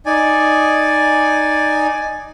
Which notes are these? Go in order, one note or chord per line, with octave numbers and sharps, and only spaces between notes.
D#4 D5 G#5